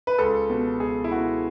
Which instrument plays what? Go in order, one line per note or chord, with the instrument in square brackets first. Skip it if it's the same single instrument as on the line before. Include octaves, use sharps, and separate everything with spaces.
[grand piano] B4
C#2 A4
B2
C#2 G#4
E4
B2 F#4